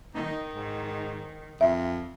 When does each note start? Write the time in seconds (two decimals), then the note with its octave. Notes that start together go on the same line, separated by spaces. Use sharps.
0.14 D#3 D#4
0.53 G#2
1.61 F2 E5